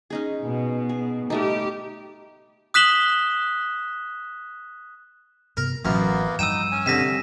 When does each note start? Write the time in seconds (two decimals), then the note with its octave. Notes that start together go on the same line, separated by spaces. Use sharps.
0.10 C#4 D#4 G#4
0.42 B2
0.89 G#4
1.30 G3 A3 D#4 G4
2.74 D#6 F#6 B6 E7 F#7 G7
5.57 G2 C3 B3 A#4
5.85 A1 F#2 A2 E3 F3 A#3 B3 A#4
6.39 G2 F3 D#4 G5 E6 D#7 E7
6.72 C#4 G#5
6.86 C2 D3 A#6 B6 E7